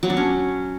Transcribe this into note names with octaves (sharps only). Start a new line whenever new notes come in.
F#3
D4
C#4